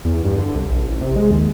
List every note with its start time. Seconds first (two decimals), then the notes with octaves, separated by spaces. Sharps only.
0.05 E2
0.25 G2
0.38 D3
0.55 C2
0.69 A#1
0.86 A1
1.01 C3
1.16 G#3
1.31 D#2